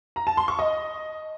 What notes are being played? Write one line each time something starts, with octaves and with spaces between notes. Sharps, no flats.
A#5
A5
C6
C#6
D#5